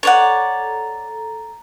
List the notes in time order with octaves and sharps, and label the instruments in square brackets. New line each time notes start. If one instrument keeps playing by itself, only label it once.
[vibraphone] A4 A#5 [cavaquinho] C#5 D5 F#5